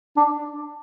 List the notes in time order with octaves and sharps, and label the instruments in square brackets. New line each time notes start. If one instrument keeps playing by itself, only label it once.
[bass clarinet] D4